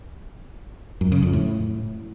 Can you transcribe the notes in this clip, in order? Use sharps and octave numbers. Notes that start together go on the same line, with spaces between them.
F#2
C#3
F2
A2